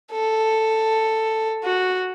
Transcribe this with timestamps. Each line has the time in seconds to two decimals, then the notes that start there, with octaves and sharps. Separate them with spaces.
0.12 A4
1.64 F#4